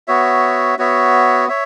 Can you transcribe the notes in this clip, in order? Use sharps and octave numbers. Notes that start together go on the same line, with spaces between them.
B3 F#4 C#5 E5
B3 F#4 C#5 E5
C#5 E5